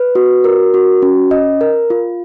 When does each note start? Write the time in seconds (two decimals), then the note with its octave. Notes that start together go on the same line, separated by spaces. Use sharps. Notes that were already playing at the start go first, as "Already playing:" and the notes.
Already playing: B4
0.15 F#4
0.44 A#4
0.74 F#4
1.02 C#4
1.31 D#5
1.61 A#4
1.90 F4